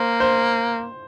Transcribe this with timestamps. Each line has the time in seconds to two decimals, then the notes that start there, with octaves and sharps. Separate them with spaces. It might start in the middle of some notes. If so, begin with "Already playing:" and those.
Already playing: A#3 C5
0.20 C5